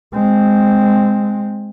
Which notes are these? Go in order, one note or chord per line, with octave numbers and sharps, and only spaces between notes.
G#3 C4